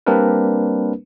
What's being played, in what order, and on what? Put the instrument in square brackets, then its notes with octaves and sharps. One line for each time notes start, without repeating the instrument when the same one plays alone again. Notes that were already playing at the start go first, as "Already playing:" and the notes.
[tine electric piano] G3 A#3 C4 D4 A#4 B4